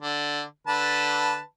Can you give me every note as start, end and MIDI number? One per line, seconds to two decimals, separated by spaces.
0.02 0.42 50
0.67 1.40 50
0.67 1.40 71
0.67 1.40 81